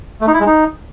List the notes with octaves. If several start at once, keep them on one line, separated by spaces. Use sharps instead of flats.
A3
D#4
E4
G#3
D#4